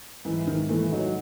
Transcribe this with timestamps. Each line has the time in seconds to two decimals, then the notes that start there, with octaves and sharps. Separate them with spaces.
0.25 G#2 E3
0.47 G#2 D#3
0.69 E3 A3
0.92 F#3 D#4